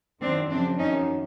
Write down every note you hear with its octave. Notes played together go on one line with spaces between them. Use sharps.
F#2 D#3 C4 D4
F#2 C#3 F3 C4 D4
F#2 D#3 C#4 D#4